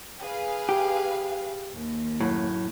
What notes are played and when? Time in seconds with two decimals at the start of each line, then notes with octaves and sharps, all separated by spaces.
0.21 G#4 B4 F5
0.69 G4
1.74 D#2
2.20 F#2 A2